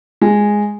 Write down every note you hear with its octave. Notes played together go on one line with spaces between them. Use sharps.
G#3